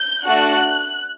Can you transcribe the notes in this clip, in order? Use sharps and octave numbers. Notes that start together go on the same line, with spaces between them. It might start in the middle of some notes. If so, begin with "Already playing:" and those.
Already playing: G6
A3 D4 F#4 A4 F#6